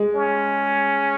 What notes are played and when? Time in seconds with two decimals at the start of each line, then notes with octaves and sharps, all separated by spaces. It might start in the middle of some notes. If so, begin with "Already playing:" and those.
Already playing: G#3
0.15 C#4